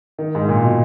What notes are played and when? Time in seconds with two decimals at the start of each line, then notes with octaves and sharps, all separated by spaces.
0.18 D#3
0.35 G#2
0.49 A#2
0.62 B2